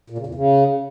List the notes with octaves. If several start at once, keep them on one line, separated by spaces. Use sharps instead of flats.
A#2
C#3
E2
C#3